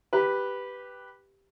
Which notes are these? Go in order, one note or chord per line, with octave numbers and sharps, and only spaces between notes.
G4 B4